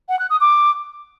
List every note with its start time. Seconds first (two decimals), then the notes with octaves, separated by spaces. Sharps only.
0.09 F#5
0.19 F#6
0.30 D#6
0.41 D6